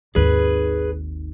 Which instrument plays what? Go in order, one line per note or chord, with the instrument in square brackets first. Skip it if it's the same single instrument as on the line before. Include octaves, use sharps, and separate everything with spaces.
[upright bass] G#1 D#2 [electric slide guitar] G#4 B4